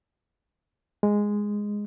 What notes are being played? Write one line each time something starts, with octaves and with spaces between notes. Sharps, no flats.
G#3